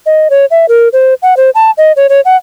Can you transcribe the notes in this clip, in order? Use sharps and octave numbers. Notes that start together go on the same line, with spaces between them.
D#5
C#5
E5
A#4
C5
F#5
C5
A5
D#5
C#5
C#5
F#5